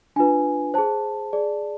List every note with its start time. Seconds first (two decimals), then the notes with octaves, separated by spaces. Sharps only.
0.16 D4 F4 B4 G#5
0.74 G#4 C5 A5
1.33 G#4 D5